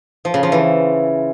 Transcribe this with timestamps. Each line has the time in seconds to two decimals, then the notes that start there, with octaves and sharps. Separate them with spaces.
0.25 F3
0.34 C#3
0.43 F3
0.52 E3